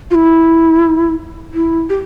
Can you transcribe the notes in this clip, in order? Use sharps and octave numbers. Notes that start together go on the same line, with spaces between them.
F4
E4
E4
G4